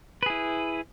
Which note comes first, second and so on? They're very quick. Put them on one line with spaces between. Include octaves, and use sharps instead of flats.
B4 G#4 E4